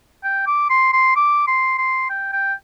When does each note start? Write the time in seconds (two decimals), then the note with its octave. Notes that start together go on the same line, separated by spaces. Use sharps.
0.24 G5
0.47 D6
0.70 C6
0.93 C6
1.16 D6
1.48 C6
1.78 C6
2.10 G5
2.33 G5